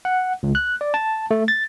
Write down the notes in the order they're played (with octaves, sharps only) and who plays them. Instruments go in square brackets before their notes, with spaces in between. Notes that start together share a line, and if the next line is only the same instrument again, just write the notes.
[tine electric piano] F#5
C#2
F#6
D5
A5
A3
A6